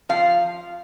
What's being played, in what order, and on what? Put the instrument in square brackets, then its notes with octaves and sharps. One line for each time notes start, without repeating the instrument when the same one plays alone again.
[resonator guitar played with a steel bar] F3 F5